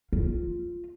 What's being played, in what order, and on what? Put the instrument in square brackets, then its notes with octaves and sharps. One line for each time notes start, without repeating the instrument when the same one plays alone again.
[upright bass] F4